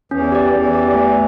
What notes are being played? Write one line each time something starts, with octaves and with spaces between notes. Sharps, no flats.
E2 E3 C#4
G4 D5
E2 E3 C#4
G4 D5
A3